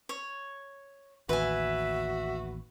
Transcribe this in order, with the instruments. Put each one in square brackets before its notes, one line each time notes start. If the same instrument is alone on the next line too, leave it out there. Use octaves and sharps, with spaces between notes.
[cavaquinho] C#5
[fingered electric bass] A1 D#2 [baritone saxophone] F#4 [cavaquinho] B4 G#5 [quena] E5